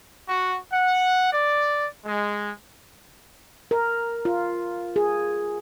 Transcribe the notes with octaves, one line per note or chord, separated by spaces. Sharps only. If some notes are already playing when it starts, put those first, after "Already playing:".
F#4
F#5
D5
G#3
A#4
F4
G#4